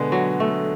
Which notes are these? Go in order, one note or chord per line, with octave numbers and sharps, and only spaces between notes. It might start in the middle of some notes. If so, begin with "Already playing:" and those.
Already playing: B2 D3 G#3 B3
F#3
A3